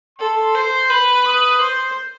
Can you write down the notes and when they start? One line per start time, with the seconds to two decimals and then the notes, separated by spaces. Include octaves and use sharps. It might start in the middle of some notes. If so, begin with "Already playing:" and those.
0.18 A4 C6
0.54 C5
0.90 B4 B5
1.26 D#6
1.60 C5 C6